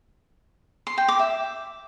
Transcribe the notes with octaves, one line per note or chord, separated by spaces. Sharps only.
C6
G5
D6
E5